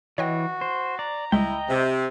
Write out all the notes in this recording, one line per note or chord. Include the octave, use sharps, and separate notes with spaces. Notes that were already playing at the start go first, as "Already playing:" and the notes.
E3 F#4 C#5 D#5 G5
C5
D5 A#5
C#2 G3 G#3 E4 D#5 G5
C3